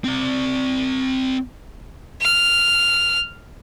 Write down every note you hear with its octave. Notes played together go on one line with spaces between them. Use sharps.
C4 D5
F6